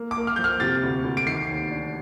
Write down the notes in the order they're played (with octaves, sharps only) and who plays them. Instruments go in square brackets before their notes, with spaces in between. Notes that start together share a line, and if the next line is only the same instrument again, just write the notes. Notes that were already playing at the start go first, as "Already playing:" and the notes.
Already playing: [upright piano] A#3
[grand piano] D6
[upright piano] A#3
[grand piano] F6
[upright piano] F3 [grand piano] G6
[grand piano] F6
[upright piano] C3 [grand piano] A6
[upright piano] D2
D2
[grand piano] D7
[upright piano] D#3 [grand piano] C7
[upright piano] D#2
D4